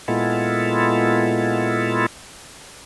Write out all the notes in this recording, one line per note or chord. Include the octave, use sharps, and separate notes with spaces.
A#2 G#3 B3 E4 F4 A4